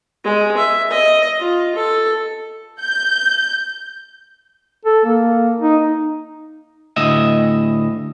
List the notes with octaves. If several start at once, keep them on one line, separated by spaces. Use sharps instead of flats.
G#3
E5
D#5
F4
A4
G6
A4
A#3
D#4
D2 A2 D#5 E5